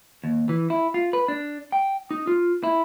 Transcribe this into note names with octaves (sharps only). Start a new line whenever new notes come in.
D#2
E3
E4
F4
B4
D4
G5
D#4
F4
E4